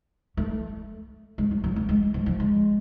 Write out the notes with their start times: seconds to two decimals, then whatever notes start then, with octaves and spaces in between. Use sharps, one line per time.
0.37 A3
1.38 G#3
1.51 F#3
1.64 F#3
1.76 A3
1.89 G#3
2.14 F3
2.26 F3
2.40 G#3